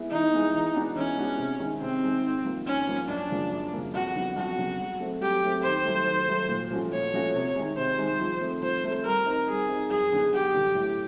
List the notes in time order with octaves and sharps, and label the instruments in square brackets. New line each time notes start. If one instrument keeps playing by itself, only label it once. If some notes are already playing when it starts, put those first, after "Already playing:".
Already playing: [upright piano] G#3 B3 E4
[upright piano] E3 [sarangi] D#4
[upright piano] G#3 B3 E4
E3
G#3 B3 D4 F#4
[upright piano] E3 [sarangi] C#4
[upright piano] G#3 B3 D4 F#4
C3
D#3 G#3
[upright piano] C3 [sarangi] C4
[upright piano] D#3 G#3
G#2
F3 A#3
[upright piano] G#2 [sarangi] C#4
[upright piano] F3 A#3
[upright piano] F#2 [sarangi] D4
[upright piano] C#3 F3 A#3
F#2
C#3 F3 A#3
[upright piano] F2 [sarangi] F#4
[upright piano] C#3 F#3 B3 D4
[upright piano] F2 [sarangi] F#4
[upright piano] C#3 F#3 B3 D4
F#3
A3 C4
[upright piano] F#3 [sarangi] G4
[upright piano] A3 C4
[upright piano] D#3 [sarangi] C5
[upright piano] F#3 A3
D#3
F#3 A3
A#2
F3 A3 C#4 F#4
[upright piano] A#2 [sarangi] C#5
[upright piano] F3 A3 C#4 F#4
C3
D#3 G#3
[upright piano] C3 [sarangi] C5
[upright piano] D#3 G#3
F3
A3 C4
[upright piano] F3 [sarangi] C5
[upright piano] A3 C4
[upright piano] G3 [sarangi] A#4
[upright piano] C4 D#4
[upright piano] G3 [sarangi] G#4
[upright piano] C4 D#4
[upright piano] F#2 [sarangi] G#4
[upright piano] D3 F#3 B3 D4
[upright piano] F#2 [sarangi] G4
[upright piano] D3 F#3 B3 D4
A2